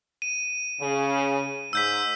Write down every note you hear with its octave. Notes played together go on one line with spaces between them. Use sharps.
D#7
C#3
G#2 E6 G6 B6